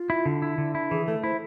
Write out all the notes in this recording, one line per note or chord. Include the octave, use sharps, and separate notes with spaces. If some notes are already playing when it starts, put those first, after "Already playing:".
Already playing: F4
E4
D3
E4
D3
E4
E3 G#4
A3 A4
E4 C5